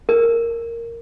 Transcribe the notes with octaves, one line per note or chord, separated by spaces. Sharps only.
A#4